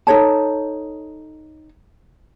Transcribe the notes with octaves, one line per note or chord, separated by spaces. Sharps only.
D#4 A4 C#5 A5